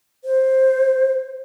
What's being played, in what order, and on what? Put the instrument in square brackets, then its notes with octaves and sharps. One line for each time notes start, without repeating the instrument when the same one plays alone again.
[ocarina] C5